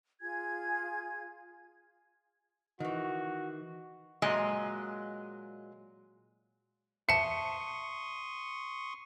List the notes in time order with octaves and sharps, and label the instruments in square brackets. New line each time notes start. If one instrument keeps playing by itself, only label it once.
[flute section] F4 G#4 G#5 G#6
[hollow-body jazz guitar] D#3 E3 [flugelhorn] F#4
[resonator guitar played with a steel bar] A#2 F#3 G#3 D#5 G#5
[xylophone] E5 A5 [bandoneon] C6 C#6 D#6 [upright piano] C#7